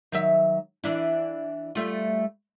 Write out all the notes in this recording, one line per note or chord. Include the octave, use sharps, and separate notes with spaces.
D#3 F#3 E5
E3 D4 E4
G3 A3 F4